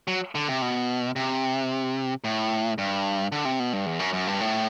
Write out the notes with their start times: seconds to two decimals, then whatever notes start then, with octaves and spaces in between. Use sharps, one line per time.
0.08 F#3
0.35 D3
0.48 C3
0.62 B2
1.16 C3
2.24 A2
2.78 G2
3.32 D3
3.45 C3
3.60 B2
3.73 G2
3.86 E2
3.99 F#2
4.13 F#2
4.27 G2
4.41 A2